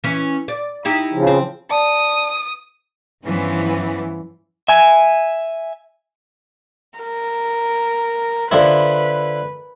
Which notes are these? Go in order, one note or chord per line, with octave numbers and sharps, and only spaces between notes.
E3 C#4
D5
D#4 E4 G4
C#3 F3
C4
D5 A5 D#6
G2 E3 F3 B3 C#4
E5 G#5
A#4
D3 F3 E4 B4